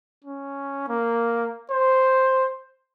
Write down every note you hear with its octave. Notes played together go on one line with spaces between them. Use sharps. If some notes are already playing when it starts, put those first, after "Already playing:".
C#4
A#3
C5